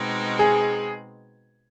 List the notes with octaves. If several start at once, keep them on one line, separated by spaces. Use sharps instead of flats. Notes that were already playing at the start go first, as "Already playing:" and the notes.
Already playing: B2 G#3 C4 D#4
G#4